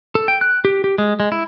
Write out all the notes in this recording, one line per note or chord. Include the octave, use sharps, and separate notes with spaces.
A4
G5
F#6
G4
G4
G#3
G#3
E4